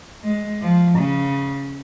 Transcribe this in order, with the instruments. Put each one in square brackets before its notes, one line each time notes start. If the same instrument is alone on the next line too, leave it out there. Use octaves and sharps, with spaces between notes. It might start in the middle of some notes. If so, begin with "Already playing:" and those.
[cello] G#3
F3
C#3